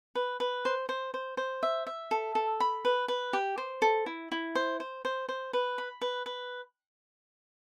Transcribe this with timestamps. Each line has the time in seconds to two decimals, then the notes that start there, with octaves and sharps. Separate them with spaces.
0.15 B4
0.40 B4
0.65 C5
0.89 C5
1.14 C5
1.37 C5
1.63 E5
1.87 E5
2.11 A4
2.35 A4
2.60 B5
2.85 B4
3.08 B4
3.33 G4
3.58 C5
3.82 A4
4.06 E4
4.32 E4
4.55 C5
4.80 C5
5.05 C5
5.29 C5
5.53 B4
5.78 B5
6.01 B4
6.26 B4